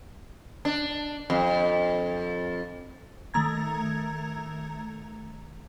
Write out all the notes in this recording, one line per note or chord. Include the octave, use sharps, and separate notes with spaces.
D4
F2
D#3 A3 A#5 G#6